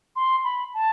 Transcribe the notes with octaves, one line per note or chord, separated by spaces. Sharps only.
C6
B5
A5